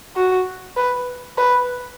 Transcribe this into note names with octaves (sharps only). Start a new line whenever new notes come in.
F#4
B4
B4